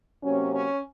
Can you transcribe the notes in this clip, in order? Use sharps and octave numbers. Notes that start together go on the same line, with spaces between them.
C3 F#3 A#3 C#4
C#4